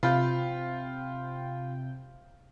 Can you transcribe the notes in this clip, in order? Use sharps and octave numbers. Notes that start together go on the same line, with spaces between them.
C3 F4 F5 G5 B5